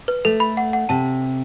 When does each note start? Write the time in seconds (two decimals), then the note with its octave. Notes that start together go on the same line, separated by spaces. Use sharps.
0.08 B4
0.25 A3 A4
0.40 B5
0.57 F#5
0.73 F#5
0.89 C3 A5